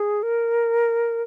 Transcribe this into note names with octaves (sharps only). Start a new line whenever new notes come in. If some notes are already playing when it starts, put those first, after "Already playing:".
Already playing: G#4
A#4